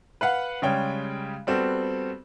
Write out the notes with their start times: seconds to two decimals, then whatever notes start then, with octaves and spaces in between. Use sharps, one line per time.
0.21 B4 F5 F#5
0.62 C#3 G3 G#3 C#5 G5
1.47 G3 B3 C4 F#4 A4